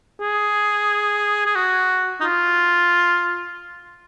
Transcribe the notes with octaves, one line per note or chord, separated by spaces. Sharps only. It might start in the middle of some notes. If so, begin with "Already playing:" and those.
G#4
G#4
F#4
D#4
F4